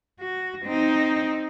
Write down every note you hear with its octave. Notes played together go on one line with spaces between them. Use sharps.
F#4
C4 D#4